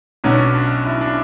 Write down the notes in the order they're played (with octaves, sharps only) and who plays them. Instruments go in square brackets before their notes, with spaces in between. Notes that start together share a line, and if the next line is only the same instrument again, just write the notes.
[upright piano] B1 B2 F#3 C#4 [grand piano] D4
[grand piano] D4
E4
D4